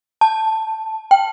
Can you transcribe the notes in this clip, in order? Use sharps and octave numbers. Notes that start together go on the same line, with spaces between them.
A5
G5